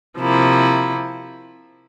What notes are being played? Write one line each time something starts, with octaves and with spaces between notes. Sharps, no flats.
C3 F3 A#3 E4